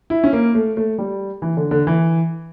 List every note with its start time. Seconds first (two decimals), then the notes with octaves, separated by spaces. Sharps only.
0.10 E4
0.24 C#4
0.33 A#3
0.55 A3
0.77 A3
0.98 G3
1.42 E3
1.57 D3
1.71 D3
1.87 E3